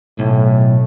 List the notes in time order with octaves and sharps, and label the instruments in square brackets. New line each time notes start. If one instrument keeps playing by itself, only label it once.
[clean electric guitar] B1 [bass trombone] A2